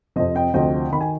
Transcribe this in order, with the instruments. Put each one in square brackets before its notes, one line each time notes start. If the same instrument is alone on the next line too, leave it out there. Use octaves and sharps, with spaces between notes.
[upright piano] F2 C3 F3 C5 D#5
D#5 G5
D2 C3 F3 D#5 G5
D#3 B5
G#5